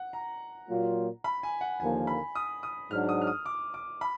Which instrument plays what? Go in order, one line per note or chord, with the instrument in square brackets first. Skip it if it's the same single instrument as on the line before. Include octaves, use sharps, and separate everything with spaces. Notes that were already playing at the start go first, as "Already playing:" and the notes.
Already playing: [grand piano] F#5
A#5
[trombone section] A#2 F#3 A#3 F4
[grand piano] B5
G#5
F#5
[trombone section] D#2 D3 F3 A#3 [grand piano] G#5
[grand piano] B5
D#6
D#6
[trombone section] G#2 F#3 D4 [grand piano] F6
[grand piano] D#6
F6
D#6
D6
D6
B5